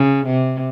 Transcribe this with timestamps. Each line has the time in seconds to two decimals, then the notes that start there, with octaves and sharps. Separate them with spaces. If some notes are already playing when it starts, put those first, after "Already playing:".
Already playing: C#3
0.26 C3